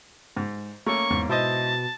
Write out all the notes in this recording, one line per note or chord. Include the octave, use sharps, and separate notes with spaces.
G#2
A3 A#3 C#4 C#6
E2 G#2
B2 E4 C5 D#5 A5